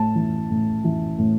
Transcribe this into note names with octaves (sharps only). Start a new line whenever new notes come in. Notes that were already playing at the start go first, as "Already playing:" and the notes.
Already playing: A2 A5
E3
A2
E3
A2